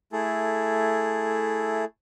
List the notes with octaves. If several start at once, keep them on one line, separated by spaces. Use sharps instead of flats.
A3 E4 G#4 A4